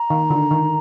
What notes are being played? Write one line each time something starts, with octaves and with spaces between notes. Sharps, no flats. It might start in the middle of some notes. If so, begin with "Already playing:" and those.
Already playing: A#5
D#3
D3
D#3